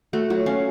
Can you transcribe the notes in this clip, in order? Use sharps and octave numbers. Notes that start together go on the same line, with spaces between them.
A3 F#4
F#3 F#4
C#4 F5